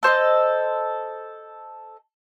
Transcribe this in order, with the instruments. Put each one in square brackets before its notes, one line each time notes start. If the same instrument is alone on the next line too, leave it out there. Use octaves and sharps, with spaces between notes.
[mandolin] A4 C5 C#5 D#5